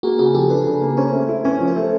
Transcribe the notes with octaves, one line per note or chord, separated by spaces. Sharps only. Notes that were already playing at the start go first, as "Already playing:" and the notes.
A#3 F#4 G#4
C#3 F#4 G#4
F3 G4 A4
D4 A4 B4
C#3
A#3
C#4 A#4 C5
A3
E4
C#4 B4 C#5
F3
A#4 C5
A3